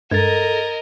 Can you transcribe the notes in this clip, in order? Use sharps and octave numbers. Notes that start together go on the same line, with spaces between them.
G2 G#3 A4 A#4 D#5 G#6 A6